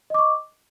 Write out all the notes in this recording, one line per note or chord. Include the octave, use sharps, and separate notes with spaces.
D#5 C#6 D6